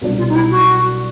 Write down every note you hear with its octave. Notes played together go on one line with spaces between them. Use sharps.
C2 B2 F#3 B3 D4
F4
D#4
E4
F#4